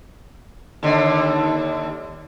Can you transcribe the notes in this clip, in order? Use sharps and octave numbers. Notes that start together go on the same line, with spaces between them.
D#2 D3